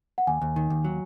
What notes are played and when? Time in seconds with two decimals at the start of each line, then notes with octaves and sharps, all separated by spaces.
0.18 F#5
0.27 D#2 G#5
0.41 D#2
0.56 D#3
0.70 D#2
0.85 F#3